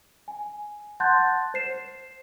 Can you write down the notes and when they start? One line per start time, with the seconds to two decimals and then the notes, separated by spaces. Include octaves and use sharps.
0.28 G#5
1.00 F#5 A5 C6 F#6 G6 A6
1.54 C5 C7 E7